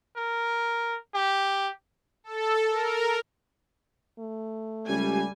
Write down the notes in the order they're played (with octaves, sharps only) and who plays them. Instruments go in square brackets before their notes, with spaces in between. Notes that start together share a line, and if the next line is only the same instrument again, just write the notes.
[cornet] A#4
G4
[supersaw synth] A4
A#4
[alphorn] A3
[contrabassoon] C#2 [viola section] G3 G#5